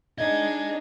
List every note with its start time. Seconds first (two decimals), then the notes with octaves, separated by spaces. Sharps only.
0.18 D4 D#4 D#5 G#5 G#6